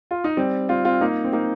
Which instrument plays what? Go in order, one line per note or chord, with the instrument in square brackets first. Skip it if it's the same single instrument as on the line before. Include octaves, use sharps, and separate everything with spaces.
[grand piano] F4
D#4
G3 C4
C4 F4
C4 F4
A#3 D#4
C4
A#3 D#4